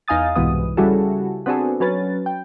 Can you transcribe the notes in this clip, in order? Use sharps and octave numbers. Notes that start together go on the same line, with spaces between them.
E2 D#4 F5 G#5 D#6 A6
C2 G#2 B2 E3 B3 D#6
C#3 G3 E4 F#4 G#4 A4
B3 C4 D4 F#4 G#4 A4
F#3 C#4 B4 A6
G5